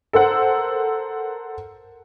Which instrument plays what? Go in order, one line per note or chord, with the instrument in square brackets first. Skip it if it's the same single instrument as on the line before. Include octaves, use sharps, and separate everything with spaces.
[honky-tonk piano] A4 A#4 C5 F#5